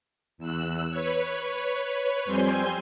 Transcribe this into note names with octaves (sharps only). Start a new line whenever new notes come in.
E2 E6 F#6
B4 C#5
F2 G3 C4 G#5 C6 G6